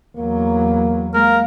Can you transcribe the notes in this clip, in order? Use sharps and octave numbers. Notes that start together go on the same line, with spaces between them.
E2 F#3 A#3
G#3 A#3 A#4